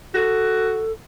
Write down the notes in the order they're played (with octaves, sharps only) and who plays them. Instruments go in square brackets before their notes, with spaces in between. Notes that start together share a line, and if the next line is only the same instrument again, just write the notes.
[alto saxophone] F#4 [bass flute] A4